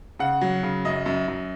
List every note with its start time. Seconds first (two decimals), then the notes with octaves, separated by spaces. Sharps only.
0.19 C#3 F#5
0.41 F#3
0.63 C#3
0.85 F#2 D#5
1.06 F#2
1.28 F#2